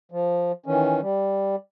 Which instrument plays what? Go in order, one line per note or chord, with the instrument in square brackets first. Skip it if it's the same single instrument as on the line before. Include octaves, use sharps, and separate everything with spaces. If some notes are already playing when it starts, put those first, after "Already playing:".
[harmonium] F3
D#3 E3 C#4
G3